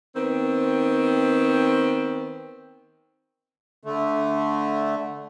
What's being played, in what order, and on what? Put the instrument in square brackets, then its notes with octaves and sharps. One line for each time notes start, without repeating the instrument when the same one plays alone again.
[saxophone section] D#3 B3 C4
[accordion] D3 A3